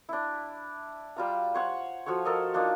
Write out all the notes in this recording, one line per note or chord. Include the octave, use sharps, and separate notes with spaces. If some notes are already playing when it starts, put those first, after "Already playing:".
D4 E4
G3 F4 A#5
C5 C#5 F#5
F3 F#4 A4 C#5
A4 A#4 D#5
A#3 D4 D#4 F4